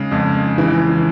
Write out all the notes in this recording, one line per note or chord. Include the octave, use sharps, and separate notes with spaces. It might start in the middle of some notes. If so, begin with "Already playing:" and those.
Already playing: C#3 G#3
F2
E3